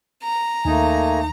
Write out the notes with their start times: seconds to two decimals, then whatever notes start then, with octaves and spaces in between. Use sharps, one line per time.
0.23 A#5
0.65 D#2 A3 A#3 D#4 G#5